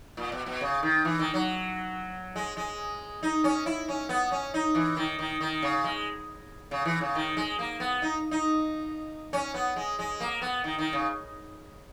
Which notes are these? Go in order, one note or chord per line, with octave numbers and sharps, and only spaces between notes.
A#2
B2
B2
C#3
D#3
E3
D#3
F#3
G#3
G#3
D#4
C#4
E4
C#4
B3
C#4
D#4
E3
D#3
D#3
D#3
C#3
G#3
C#3
E3
C#3
D#3
G#3
A#3
B3
D#4
D#4
C#4
B3
G#3
G#3
A#3
B3
D#3
D#3
C#3